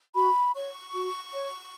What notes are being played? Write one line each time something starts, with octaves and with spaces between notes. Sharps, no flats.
F#4 B5
C#5 C#6
F#4
C#5